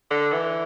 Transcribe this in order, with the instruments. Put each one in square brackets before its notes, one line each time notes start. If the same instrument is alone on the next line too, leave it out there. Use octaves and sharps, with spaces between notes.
[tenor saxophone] D3
E3